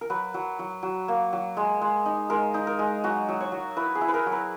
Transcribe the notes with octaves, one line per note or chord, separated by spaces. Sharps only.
A#4
F#3 B4
F#3
F#3
F#3
A#3
F#3
G#3
G#3
D#4
G#3 A#4
D#4
A#4
G#3
F#3 F#4
F#3
C#5
F#3
E4 B4
G#4
E4
B4
A#4
F#3
B4